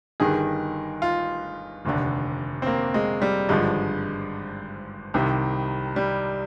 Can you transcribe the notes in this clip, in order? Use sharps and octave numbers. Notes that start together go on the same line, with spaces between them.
G1 G2 D#3 G#4
F4
F1 D#2 D3
C4
A#3
G#3
G3
G#1 G2 D3 F3 G#3
C2 C3 D#3
G3